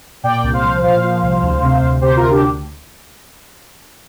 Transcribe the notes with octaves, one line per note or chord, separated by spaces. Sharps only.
A#2 D5 G5
C2
C5 F5
F3
A#2 C5 F5
F3
C2
D2
C3
D2
C3 G4 C5
D2 F4 A#4
D4 G4